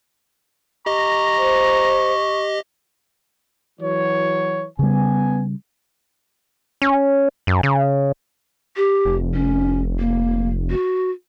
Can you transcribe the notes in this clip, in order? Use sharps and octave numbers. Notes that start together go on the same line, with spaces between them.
G4 D#5 A#5 C#6
C5
E3 F#3 C#5
C#3 G3 B3 G#5
C#4
F#2
C#3
G4
F1
C#4
A#3
F#4